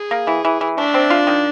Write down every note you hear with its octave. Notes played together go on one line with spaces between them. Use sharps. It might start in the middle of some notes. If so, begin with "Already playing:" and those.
Already playing: G#4
A#3
E3
E3
E3
A3 D4
C4
F4
D#3